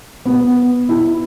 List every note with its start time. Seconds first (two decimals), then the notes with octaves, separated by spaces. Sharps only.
0.26 B3
0.89 E4